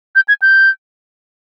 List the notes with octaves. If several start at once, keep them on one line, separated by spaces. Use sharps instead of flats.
G6
G#6
G6